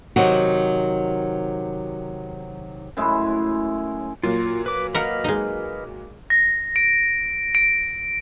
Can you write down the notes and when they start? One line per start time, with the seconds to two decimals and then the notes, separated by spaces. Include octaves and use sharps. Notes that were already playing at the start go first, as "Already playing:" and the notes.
0.16 C3 D#3 F#3 F#4
2.97 F#2 A2 G#3 E4
4.23 A#2 F#3 A#3 F4
4.66 B4 D6
4.94 A#4 B4 D#5 F5 F#5
5.24 G#3 D#4
6.30 A#6
6.76 D7
7.55 D7